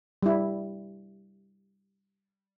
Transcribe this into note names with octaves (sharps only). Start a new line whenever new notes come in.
G3 E4